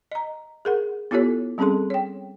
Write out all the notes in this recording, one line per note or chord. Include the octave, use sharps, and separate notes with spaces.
D#5 A#5
G#4 A#4 F#5
B3 E4 F4 G4 A4 C#5
G3 C4 C#4 G#4 A4 C6
C#5 G5